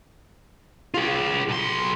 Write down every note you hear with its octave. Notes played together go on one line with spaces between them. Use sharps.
F4 G#4
B1 C6